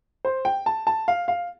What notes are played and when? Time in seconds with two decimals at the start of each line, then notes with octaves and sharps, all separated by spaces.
0.25 C5
0.45 G5
0.66 A5
0.87 A5
1.08 F5
1.28 F5